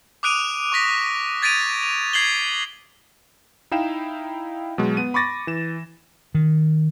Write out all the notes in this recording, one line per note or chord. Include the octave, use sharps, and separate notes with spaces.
D6 D#6 F#6 D7 D#7 F7
C#6 D6 A#6 B6
G#6 A6 B6 D7 D#7 F7
F7
G#6 C7 F#7 G7
D#4 E4 F5 G5 E7
B2 F#3 G#3
B3 D#7
B5 C#6 D6 A6 A#6
E3 E7
D#3